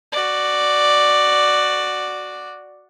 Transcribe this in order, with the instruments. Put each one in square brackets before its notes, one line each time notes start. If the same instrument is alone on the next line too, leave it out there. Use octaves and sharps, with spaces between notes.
[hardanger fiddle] F#4 D5